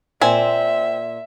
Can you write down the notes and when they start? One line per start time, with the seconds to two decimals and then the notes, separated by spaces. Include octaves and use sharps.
0.22 A#2 C4 E5 G#5